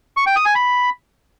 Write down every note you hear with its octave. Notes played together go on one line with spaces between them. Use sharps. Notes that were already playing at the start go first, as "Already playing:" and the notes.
C#6
G5
D#6
G#5
B5